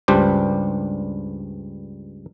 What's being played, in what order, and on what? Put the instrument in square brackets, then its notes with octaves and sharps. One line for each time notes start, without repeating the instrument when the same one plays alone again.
[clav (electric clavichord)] C#2 G2 G3 D4 G4 C5